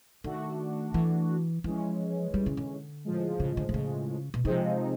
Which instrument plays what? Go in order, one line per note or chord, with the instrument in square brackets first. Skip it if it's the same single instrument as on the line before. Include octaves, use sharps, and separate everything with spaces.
[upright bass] D#3 [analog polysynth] A3 D4 F#4
[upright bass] E3
[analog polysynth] E3 G#3 C#4 [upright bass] F3
[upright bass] G3
C#3
D3
[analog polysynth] A2 F3 G#3
[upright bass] C#3
D3
C3
C#3
B2
[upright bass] C3 [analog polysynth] F3 G#3 C4 D#4